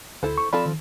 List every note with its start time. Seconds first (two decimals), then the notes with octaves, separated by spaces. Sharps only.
0.23 D2 E4 A4 C5
0.38 C#6
0.53 F3 C4 A4 D5 B5
0.66 D#3